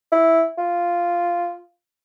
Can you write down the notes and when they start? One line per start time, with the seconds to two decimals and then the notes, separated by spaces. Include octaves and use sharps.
0.12 E4
0.58 F4